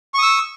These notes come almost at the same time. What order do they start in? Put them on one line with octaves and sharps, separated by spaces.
C#6 D#6 E6